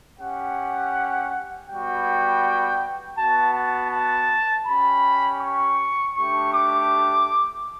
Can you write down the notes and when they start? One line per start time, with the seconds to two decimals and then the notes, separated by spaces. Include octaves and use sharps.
0.19 C#4 G4 F#5
1.68 G3 B3 F#4 G5
3.18 B3 F#4 A5
3.54 A5
3.92 A5
4.67 C#4 G4 B5
5.42 C#6
6.15 A3 D4 G4 C#6
6.53 D6